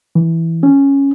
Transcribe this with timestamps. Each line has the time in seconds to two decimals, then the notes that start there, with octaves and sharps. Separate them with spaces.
0.15 E3
0.63 C#4